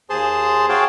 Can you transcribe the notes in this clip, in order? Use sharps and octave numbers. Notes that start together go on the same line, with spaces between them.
D#2 G#4 C5 A5 C6
F#4 G#4 C#5 F5 G5 A5